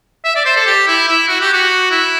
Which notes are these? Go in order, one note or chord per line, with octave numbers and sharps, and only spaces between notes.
E5
D5
C5
A4
G4
E4
E4
F#4
G4
F#4
E4